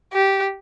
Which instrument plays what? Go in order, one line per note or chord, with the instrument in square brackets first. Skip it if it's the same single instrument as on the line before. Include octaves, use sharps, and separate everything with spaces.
[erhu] G4